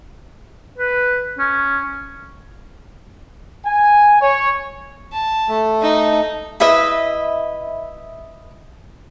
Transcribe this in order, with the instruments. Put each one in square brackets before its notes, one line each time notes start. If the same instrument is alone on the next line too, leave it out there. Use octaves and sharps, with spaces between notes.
[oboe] B4
C#4
[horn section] G#5
C#5
[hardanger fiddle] A5
[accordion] A3
[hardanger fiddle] D#4
[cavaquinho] E4 B4 D#5 E5